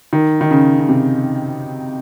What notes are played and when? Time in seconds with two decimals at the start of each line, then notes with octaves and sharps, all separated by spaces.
0.13 D#3
0.41 D#3
0.51 C#3
0.79 C#3
0.89 C3